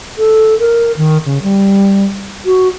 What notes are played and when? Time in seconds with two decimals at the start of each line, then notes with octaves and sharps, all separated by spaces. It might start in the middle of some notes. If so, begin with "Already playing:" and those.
0.18 A4
0.59 A#4
0.97 D#3
1.25 C#3
1.43 G3
2.46 F#4